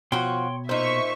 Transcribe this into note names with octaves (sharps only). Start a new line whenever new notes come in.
B2 F3 F#4 C#5 G5 C6
A#2 D#4 C5 E5 C#6